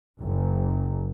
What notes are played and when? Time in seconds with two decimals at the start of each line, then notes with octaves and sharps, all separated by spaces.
0.21 F#1